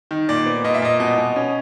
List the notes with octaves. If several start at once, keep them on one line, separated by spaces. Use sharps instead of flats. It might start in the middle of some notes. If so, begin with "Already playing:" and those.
D#3
A#2 D5
B3
A#2 D#5
E5
A#2 D#5
B2 D#5
B2
C#4